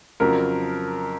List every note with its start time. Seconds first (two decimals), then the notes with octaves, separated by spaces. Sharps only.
0.20 F2 C#3 F#3 A#4